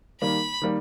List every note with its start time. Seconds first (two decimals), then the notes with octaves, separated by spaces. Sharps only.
0.21 D#3 G3 A#3 B5
0.62 D#3 G3 A#3